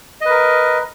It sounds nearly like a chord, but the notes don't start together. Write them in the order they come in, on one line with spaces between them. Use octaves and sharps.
D#5 B4 A#4